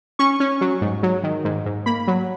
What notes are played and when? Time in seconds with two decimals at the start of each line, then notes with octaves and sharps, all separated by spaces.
0.19 C#4 C#6
0.40 C#4
0.61 F#3
0.81 G#2
1.03 F#3
1.23 D#3
1.45 G#2
1.66 G#2
1.86 A#3 B5
2.07 F#3